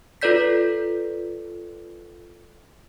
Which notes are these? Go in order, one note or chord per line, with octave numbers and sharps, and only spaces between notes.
F4 A4 B4 D5 G6 B6